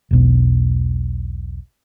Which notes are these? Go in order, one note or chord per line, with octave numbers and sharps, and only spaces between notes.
E1 B1